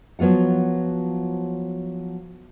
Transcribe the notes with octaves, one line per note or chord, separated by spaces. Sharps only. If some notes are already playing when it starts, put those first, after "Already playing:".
F3 F#3 B3 F4 F#5